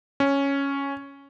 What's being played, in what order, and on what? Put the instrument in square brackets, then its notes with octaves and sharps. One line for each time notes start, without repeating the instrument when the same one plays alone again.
[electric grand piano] C#4